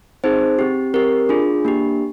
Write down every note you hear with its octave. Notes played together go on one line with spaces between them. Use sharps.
C4 D#4 G#4 C5
C4 G4
C4 G4 A#4
D4 F4 G#4
A#3 D4 G4